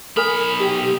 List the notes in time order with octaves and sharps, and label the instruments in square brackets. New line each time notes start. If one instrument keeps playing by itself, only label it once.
[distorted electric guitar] B1 B5 [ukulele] A#4 G#5 [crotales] D#6
[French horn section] G4